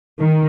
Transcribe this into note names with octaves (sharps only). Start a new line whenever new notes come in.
D#3